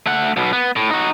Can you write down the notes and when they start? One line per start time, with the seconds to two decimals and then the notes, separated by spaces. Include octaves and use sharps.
0.06 A3 F#5
0.37 B1 B2
0.53 B3
0.76 A2
0.90 D#4 F#4